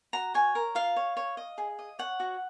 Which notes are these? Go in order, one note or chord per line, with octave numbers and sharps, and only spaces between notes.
F#4 A#5
C#5 G#5
A#4
F4 F5
C#5
C#5
D#5
G#4
D#5
C#5 F#5
F#4